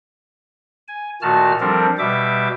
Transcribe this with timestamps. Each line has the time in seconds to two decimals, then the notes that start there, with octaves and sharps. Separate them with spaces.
0.88 G#5
1.22 A#2 D#3 A3 F#4 A5 F6
1.60 F3 G3 C4 D4 A4 A#4
1.99 B2 G3 E5 D6